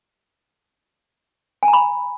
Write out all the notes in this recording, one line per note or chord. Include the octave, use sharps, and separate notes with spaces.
G#5
A#5
B5